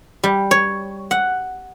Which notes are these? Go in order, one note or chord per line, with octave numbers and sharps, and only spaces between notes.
G3
C#5
F#5